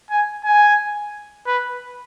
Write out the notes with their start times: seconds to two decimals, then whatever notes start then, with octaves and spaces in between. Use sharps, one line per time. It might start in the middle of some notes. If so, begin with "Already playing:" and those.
0.10 G#5
0.45 G#5
1.47 B4